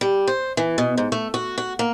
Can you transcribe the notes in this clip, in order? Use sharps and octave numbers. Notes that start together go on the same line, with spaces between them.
G3
C5
E3
B2
G#2
A3
F#4
F#4
A#3